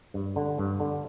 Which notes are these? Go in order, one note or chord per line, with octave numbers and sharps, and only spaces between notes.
G2
D3
G2
D3